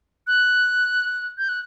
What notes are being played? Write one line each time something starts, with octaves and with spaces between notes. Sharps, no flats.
F#6
G6
F#6